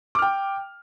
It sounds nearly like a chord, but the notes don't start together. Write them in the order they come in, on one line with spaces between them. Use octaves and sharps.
D6 F6 G5